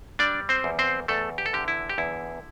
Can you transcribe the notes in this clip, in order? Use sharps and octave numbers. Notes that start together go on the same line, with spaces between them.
G3 D4 D5
C4 C5
E2
C4 C5
E2 A3 A4
G4
A4
D3 G4
E4
G4
E2 E4